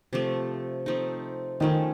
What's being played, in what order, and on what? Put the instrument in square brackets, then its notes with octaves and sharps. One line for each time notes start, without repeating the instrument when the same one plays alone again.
[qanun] C3 F3 A3
F3 A3 C4 D#4
[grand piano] D#3 [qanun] F3 A3 C#4